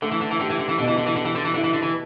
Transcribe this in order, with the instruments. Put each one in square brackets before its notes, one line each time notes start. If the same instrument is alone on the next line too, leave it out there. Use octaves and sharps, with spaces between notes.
[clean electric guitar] D3 [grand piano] A3
[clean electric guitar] E3
D3
E3
[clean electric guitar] D3 [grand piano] G4
[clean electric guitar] E3
D3
E3
[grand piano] B2 [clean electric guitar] D3
[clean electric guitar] E3
D3
E3
[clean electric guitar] D3 [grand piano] G4
[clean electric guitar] E3
D3
E3
[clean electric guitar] D3 [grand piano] E4
[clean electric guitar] E3
D3
E3